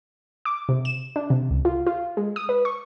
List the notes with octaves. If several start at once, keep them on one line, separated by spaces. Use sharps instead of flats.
D6
C3
E7
D4
C3
C#2
F4
F4
G#3
D#6
B4
C#6